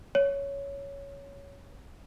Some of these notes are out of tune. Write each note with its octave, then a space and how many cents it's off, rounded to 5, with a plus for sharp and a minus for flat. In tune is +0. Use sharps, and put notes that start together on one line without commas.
C#5 +10